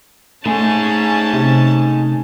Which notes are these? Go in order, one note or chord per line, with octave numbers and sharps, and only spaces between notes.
A3 C#4 D#4 G#4 A5
C3